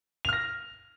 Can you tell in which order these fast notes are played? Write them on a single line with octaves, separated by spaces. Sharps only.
F7 F6 A#6